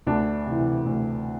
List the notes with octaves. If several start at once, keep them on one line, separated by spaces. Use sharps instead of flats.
D2 D4
C3 E3
D2